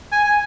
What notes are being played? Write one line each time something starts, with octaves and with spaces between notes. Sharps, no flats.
G#5
G#5